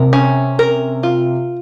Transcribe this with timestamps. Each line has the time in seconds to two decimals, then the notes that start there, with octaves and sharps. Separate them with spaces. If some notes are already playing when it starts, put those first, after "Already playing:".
Already playing: C3 A#4
0.13 C#4
0.59 A#4
1.03 F4